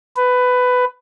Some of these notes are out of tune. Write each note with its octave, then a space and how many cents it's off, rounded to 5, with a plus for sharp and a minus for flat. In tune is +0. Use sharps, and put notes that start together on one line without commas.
B4 +15